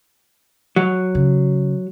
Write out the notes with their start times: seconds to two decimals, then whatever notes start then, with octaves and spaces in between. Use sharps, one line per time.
0.76 F#3
1.15 C#3